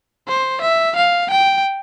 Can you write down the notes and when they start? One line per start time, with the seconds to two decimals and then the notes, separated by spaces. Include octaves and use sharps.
0.28 C5
0.61 E5
0.96 F5
1.30 G5